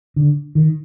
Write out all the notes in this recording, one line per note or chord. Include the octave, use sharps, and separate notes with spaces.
D3
D#3